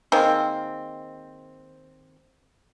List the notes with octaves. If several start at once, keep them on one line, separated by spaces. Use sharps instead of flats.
D#3 G#3 A#3 C4